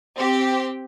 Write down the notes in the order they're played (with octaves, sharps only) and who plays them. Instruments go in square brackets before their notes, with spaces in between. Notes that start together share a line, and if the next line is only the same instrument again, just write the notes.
[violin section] C4 G4